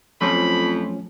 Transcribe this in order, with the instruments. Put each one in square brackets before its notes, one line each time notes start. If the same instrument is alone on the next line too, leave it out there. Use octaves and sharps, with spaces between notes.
[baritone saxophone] F2 [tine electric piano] F3 F#3 C#4 [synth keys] A3 [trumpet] B5